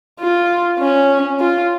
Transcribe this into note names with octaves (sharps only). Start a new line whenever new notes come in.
F4
C#4
F4